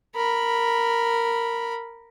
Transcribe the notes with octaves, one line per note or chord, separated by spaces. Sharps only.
A#4 B5